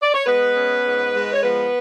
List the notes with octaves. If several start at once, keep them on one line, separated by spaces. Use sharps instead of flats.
D5
C#5
G#3 B3 B4
C#4
G#2
G#3
C#5
F3 B3 B4